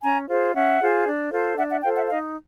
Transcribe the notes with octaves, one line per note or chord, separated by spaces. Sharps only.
C#4 G#5 A#5
F4 G#4 C5
C#4 E5 F#5
F4 G#4 C5
D4
F4 A4 C5
D4 E5 F#5
E5 F#5
F4 A4 C5 F5 G5
E5 F#5
D#4 D#5 F5